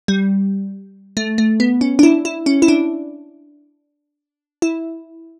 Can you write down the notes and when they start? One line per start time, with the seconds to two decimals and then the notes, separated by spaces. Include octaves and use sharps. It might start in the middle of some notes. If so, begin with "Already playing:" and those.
0.08 G3
1.17 A3
1.38 A3
1.60 B3
1.81 C#4
1.99 D4
2.03 E4
2.25 E4
2.46 C#4
2.62 E4
2.68 D4
4.62 E4